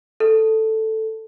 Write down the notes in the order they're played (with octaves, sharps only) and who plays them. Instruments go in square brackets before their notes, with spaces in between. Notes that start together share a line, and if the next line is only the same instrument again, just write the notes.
[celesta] A4